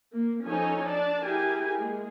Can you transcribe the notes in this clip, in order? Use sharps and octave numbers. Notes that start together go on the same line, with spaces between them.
A#3
F3 C#4 D#4 A4 C#5 G#5
D4 D5 A5
E4 G4 G#4 A#4 G#5
G#3 A#3 G#4